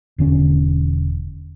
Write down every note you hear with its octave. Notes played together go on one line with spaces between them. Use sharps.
E1 D3 C#4